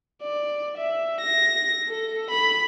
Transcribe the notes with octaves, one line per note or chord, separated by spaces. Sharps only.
D5
E5
A#6
A4
B5